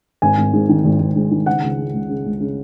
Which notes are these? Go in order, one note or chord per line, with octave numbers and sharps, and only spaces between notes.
G#1 G#5
G#1
G#2
D#3
G#1
G#1
G#2
D#3
C#3 F#5
C#2
C#3
C#2
C#3
C#2
C#3